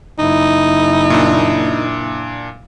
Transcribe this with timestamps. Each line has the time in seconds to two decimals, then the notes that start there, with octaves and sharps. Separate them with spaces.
0.19 F#1 D#4 E4
1.10 A#2 D4